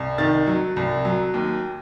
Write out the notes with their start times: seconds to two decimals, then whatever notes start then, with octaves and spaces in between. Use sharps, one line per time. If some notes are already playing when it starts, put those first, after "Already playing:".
Already playing: C2
0.18 D#3 A6
0.47 F#3
0.76 C2
1.05 F#3
1.34 D#2